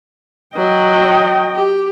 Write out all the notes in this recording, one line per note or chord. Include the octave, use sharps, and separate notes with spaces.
F#3 D#5 G5
G4